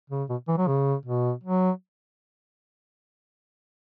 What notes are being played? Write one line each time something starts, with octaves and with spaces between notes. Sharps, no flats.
C#3
B2
E3
F#3
C#3
B2
F#3